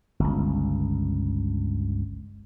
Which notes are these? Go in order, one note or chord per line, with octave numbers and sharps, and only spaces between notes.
G1 C#2